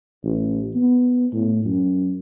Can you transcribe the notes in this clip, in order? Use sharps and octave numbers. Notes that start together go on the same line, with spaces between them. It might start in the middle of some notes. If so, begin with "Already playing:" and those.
A1
B3
A2
F#2